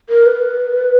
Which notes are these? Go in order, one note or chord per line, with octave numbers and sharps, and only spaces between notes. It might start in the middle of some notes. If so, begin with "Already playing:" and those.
A#4
B4